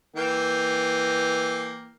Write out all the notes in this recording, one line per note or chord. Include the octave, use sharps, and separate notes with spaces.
E3 A#3 G5